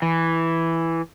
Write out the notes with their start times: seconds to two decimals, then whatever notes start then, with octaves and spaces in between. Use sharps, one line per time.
0.02 E3